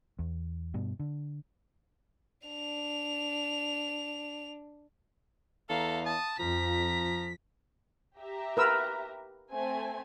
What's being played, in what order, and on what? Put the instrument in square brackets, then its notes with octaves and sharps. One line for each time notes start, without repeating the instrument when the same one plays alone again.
[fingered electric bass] E2
G2 B2
D3
[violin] D4 F7
[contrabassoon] E2 [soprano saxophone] A4 [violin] F5 A#5
[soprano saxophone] A5 [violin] D#6
[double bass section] F2 [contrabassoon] F3 [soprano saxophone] A#5 [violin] B6
[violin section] G4 E5 A#5
[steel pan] A#4 B4 E6
[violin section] A3 C4 G#5